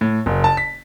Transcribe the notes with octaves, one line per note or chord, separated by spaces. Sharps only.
A2
F#1
A5
B6